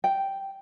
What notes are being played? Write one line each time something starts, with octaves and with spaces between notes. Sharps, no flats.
G5